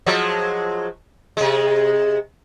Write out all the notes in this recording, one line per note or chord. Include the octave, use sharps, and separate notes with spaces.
F3 F#3 G#3
C3 G#3